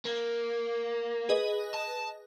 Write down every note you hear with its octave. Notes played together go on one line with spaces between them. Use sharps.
A#3
G#4 B4 D#5
A5